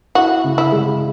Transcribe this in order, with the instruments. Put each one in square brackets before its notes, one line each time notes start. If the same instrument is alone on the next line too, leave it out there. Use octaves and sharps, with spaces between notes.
[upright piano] E4 [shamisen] F#4
[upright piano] C#3
[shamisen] E4
[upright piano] G#3